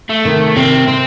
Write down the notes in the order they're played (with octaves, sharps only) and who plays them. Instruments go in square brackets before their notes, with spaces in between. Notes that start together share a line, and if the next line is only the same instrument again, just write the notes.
[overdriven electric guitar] A3
[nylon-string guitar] C3 D#3
[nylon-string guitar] C3 D#3 [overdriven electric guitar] C4
[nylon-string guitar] C3 [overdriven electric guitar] C4